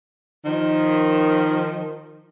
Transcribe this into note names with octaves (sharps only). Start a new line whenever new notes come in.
D#3 F3